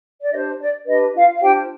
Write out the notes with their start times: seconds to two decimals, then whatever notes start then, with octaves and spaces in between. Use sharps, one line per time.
0.21 D5
0.31 D4 G4 C5 D#5
0.59 D5
0.86 D4 G4 B4 D#5
1.15 F4 F5
1.36 F5
1.42 D4 F4 G4 C5 G5